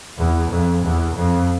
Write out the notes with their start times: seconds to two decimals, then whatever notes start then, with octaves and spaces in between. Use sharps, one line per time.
0.18 E2
0.51 F2
0.84 E2
1.16 F2